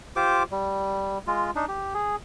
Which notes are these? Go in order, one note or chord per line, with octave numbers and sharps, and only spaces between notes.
F4 G4 C5 D6
G3
G#3 F4
D4 D#4
G4
G#4